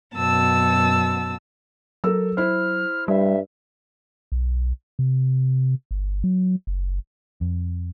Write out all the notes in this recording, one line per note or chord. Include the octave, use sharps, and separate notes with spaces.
F#2 B2 A5 E6
F#3 A4 A#4 E6
E4 C5 F6
G2 G3 E5
B1
C3
G1
F#3
F#1
F2